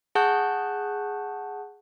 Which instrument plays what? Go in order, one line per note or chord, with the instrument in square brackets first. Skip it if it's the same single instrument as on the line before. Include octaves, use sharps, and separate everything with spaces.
[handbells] G#4 F#5 A5 C#6 F#6 G6